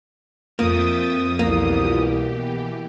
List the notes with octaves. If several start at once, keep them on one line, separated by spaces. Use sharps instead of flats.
F2 A#3 E5 G5 D#6 A6
C2 B2 E3 A#3 G4